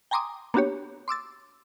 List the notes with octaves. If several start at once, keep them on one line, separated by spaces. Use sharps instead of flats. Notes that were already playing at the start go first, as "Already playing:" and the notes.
G5 G#5 A#5 C6 D6 D#6
A#3 B3 D4 F#4 G4 C#5
C6 D6 E6 A6